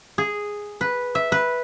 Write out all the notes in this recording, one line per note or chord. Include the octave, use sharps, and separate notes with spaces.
G#4
B4
E5
B4